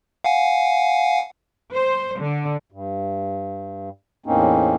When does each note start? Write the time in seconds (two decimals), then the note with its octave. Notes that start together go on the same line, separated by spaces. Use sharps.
0.24 F5 F#5 G#5
1.73 C5
2.20 D3
2.72 G2
4.26 E2 A2 A#3 C4 C#4 D#4